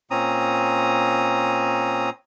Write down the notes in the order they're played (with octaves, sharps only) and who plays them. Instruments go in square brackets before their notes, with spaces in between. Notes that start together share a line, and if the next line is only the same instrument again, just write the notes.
[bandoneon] A#2 C4 C#4 A#5 D#6